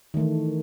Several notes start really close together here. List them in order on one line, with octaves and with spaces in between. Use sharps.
D#3 A3 E3